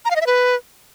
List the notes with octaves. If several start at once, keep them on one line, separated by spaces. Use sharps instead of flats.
A#5
F5
D#5
E5
B4